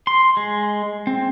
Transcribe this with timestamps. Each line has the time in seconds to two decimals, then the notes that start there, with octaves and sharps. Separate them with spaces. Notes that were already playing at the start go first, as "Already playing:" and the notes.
0.07 C6
0.37 G#3
1.07 C4